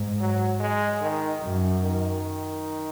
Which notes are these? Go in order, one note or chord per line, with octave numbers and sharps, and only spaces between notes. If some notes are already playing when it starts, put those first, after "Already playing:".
Already playing: G#2
F#3
G#3
D#3
F#2
D#3